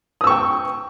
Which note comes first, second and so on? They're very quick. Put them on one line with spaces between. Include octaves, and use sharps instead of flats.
D#6 E6 C#6 G5